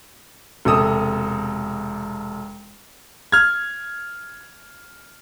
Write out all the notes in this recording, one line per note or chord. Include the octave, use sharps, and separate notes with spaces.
E1 C3 A4 D#6 E6
F6 G#6